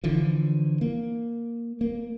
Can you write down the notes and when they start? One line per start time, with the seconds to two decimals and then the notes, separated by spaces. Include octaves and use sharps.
0.04 D3 E3 F3
0.81 A#3
1.81 A#3